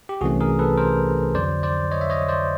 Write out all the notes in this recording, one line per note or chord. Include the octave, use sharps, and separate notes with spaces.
G4
C2 C3 E3 A3 C#4 F#4 G#4
G#4 A#4
A4 B4
A#4 C5
F2 D3 F#3 C5 D5
C5 D5
C#5 D#5
E5
C#5 D#5
C5 D5